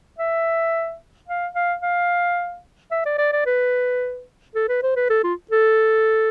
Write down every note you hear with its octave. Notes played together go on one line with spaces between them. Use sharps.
E5
F5
F5
F5
E5
D5
D5
D5
B4
A4
B4
C5
B4
A4
F4
A4